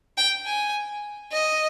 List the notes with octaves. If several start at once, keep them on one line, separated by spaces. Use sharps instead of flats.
G5
G#5
D#5